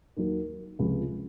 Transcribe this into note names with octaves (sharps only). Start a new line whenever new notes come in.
D#2 D#3 F#3 A#3
C#2 C3 F3